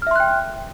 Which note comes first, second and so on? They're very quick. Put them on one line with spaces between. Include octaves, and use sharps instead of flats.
F6 E5 C6 F#6 G5